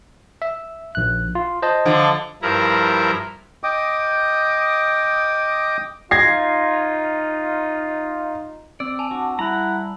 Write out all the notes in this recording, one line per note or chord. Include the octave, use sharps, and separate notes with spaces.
E5
A#1 F#6
F4
C5 D#5 A5
D3 F3
G2 F3 E4 A#4 A#5
D#5 G5 D6 D#6
D#4 F4 G#6 A#6 C7
C4 D5 E6
G#5 A5 F7
D4 F#4
G3 E4 F#5 A#5 F#7